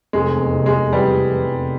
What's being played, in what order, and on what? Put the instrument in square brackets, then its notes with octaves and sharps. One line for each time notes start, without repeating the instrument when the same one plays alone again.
[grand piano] F1 [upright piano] G#3
[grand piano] E2
C3
[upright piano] G#3
[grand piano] F1
[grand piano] E3 [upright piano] G3
[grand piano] F1
E3
F1